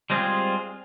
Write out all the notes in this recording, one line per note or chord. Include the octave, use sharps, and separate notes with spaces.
G3 G#3 C4 F4 G#4